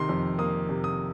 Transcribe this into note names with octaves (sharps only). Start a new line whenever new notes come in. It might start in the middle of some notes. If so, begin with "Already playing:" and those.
Already playing: C3 D#3 C6
F2
A#3 D#6
C3
D#6